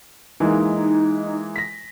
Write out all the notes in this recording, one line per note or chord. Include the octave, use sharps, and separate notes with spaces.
E3 G#3 A#3 D#4
A#6 B6